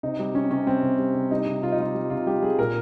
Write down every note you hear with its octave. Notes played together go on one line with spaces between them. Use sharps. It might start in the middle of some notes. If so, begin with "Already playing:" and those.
C3 D#4
G3
G3 C#4
C3 C#4
G3 C4
C3
G3
C3
G3 D#4
C3
C3 F4
D#4
G3 F4
G3
C3 F4
G3 G4
G3 G#4
A#2 A#4